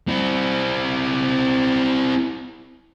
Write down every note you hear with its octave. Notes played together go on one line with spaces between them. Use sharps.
C4 E4